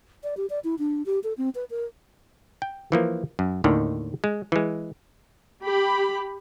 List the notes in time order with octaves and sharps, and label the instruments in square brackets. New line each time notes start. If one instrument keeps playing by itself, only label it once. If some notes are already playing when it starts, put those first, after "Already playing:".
[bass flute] D5
G4
D5
E4
D4
G4
A4
C4
B4
A#4
[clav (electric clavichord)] G5
E3 F3 A#3
F#2
D#2 A2 D3 D#3
G#3
E3 G#3
[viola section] G4 B5